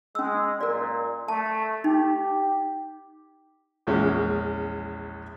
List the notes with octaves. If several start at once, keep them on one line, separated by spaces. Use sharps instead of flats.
G#3 C#4 E6
A#2 A#4 D5
A3 A5
D#4 G4
A#1 E2 G#3 C#4